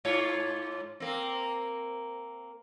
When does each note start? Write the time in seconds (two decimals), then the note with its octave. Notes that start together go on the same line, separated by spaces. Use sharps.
0.05 G#2 F4 C#5
1.00 A#3 C4